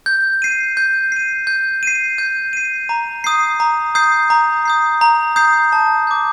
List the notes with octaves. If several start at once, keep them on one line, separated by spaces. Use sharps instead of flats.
G6
C7 D#7
G6
C7 D#7
G6
C7 D#7
G6
C7 D#7
A#5
D#6 G6 C7
A#5
D#6 G6 C7
A#5
D#6 G6 C7
A#5
D#6 G6 C7
A5
D6 G6